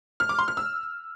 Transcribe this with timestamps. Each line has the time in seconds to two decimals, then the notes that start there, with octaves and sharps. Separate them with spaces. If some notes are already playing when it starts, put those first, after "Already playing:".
0.20 F6
0.29 D6
0.39 C6
0.48 F6
0.57 E6